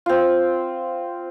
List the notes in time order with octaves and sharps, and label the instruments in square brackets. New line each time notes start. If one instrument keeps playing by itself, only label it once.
[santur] C4 F4